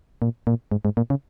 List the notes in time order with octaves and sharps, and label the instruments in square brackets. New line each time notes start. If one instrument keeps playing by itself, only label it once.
[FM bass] A#2
A#2
G#2
G#2
A#2
C#3